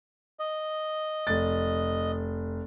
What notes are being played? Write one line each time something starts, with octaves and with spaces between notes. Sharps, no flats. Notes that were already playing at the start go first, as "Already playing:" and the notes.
D#5
F1 A6